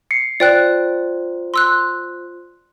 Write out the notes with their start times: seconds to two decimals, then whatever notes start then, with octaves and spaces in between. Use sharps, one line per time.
0.11 C7 C#7
0.40 F4 C5 D5 G5 F#6
1.54 C6 E6 F#6